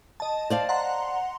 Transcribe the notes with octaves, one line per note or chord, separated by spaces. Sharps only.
D#5 A5
C5 D5 F5
F#5 A#5 C6